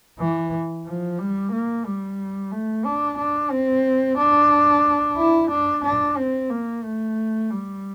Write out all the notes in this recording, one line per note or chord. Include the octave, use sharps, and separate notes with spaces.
E3
F3
G3
A#3
G3
A3
D4
D4
C4
D4
E4
D4
D4
C4
A#3
A3
G3